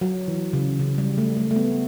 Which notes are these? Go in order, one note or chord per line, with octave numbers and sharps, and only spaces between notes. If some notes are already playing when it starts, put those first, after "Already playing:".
F#3
E3
C#3
C#3
G3
A3
A3
A3
B3